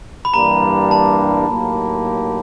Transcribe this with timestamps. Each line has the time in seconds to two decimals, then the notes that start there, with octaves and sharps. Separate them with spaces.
0.25 B5
0.33 G2 E3 G3 A#3 D4 A#5
0.91 A5
1.47 A2 F#3 A#3 D#4 G4